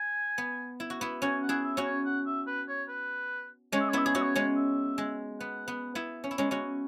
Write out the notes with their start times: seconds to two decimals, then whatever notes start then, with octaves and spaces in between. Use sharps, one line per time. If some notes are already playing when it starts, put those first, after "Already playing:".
Already playing: G#5
0.38 B3
0.80 E4
0.90 F#4
1.01 B3 E4
1.22 C#4 F#4 G#5
1.43 F#5
1.49 E4 G#4
1.63 E5
1.77 C#4 F#4
1.85 C#5
2.05 F#5
2.26 E5
2.47 B4
2.69 C#5
2.89 B4
3.72 G#3 C#4 C#5
3.80 E5
3.89 C#5
3.93 B3 E4 E5
4.06 G#4 C#5
4.14 C#4 F#4 E5
4.22 C#5
4.35 G#3 C#4
4.56 E5
4.98 G#3
5.40 B3 F#5
5.68 B3
5.95 B3 E4
6.24 C#4
6.31 E4
6.38 G#3 C#4
6.51 C#4 F#4